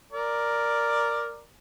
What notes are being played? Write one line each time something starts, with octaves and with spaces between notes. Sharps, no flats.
A#4 D5